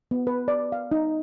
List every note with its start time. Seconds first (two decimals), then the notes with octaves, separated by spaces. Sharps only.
0.11 B3
0.27 B4
0.48 D5
0.72 F5
0.92 D#4